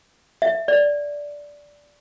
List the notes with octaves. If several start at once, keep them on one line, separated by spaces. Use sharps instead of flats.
E5
D5